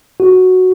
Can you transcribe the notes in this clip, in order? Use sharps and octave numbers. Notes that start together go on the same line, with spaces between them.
F#4